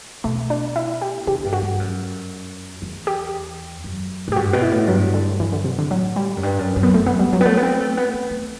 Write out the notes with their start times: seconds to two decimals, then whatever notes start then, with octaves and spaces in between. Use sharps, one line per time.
0.24 B2 A3
0.50 D4
0.76 E4
1.01 G4
1.27 D3 G4
1.44 G2
1.53 F#4
1.62 G2
1.79 F#2
2.82 E2
3.07 G4
3.84 F#2
4.28 A2 G4
4.36 G2 F#4
4.53 B2
4.62 E4
4.71 A2
4.88 G2 F#3
5.14 D3
5.40 F#2 E3
5.52 D3
5.64 C3
5.79 D3
5.91 A2 F#3
6.16 G3
6.37 F#2
6.43 G2
6.59 F#2
6.76 F#2
6.83 B3
6.94 A3
7.06 F#2 B3
7.19 G3
7.32 F#3 G3
7.41 B3
7.45 F#3 A3
7.57 B3
7.63 C4
7.80 A3
7.97 B3
8.14 C4
8.31 A3